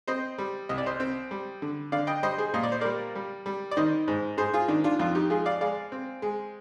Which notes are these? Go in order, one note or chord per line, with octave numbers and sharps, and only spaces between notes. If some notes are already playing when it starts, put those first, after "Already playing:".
C4 C5 D#5
G3
C2 D#5
D5
C5 D#5
C4
G3
D3
D3 D5 F5
D#5 G5
G3 C5 D#5
G#4 C5
A#2 D#5
D5
C5
G3 A#4 D5
G3
G3
D5
D#3 C5 D#5
G#2
G#2 G#4 C5
F4 G#4
D#3 D4
D4 F4
F2 D4 F4
D#4 G4
G#3 F4 G#4
D5 F5
G#3 D5 F5
C4
G#3